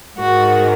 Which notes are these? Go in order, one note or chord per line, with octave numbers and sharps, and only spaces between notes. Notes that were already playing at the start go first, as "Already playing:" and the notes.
G#2 D#3 F#4